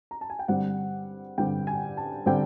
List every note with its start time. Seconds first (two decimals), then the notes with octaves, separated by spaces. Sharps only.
0.11 A#5
0.21 A5
0.30 G#5
0.39 G5
0.48 G2 D3 G3 C4 F#5
1.38 G2 D3 G3 C4 G5
1.67 G#5
1.97 A5
2.26 D3 G3 C4 G5